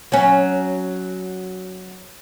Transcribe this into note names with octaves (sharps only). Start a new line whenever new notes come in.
F#3 C#4